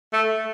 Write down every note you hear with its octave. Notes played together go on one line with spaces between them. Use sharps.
A3